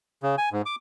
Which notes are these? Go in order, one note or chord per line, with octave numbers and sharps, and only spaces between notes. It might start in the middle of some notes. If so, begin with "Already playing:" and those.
C#3
G#5
G#2
D6